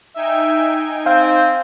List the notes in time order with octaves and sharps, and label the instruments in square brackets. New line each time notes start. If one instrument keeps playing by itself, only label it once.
[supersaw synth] D#4 G5 G#5 [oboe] E5
[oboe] C4 [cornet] C5 [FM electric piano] F5